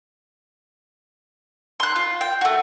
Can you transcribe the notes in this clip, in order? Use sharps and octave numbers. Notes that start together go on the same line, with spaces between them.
C6 F#6
F4
G5
A3 F#4